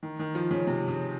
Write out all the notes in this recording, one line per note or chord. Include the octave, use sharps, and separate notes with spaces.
D#3
D#3
F3
C#3
C3
C#3